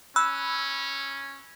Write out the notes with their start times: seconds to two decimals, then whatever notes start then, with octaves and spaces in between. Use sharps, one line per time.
0.16 C#4 B5 E6 F#6